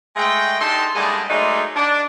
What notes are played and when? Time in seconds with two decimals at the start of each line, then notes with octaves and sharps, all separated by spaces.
0.16 G#3 A3 G5
0.60 D3 D#4 G4 A4 A5 C6
0.95 A2 D3 G3 G#3 A#3 G#4
1.30 F#3 G#3 A3 D#4 A#4 D5
1.76 D4